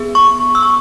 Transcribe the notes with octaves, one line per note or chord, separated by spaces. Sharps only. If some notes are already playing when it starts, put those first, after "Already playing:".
Already playing: B3 G#4
C#6
E6
C#6